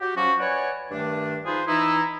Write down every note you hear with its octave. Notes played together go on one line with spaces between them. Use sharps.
F#4 G4
F3 F#3 C#4 F#4
B4 C#5 D5 F#5 G#5
G2 D#3 A3 D4
F3 D#4 F4 G#4 B4 C5
E3 D#4 E4